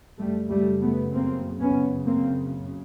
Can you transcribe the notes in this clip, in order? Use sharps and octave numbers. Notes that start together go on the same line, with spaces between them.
F#2 C#3 G3 A3
G3 A3
A3 B3
A#3 C4
B3 C#4
A#3 C4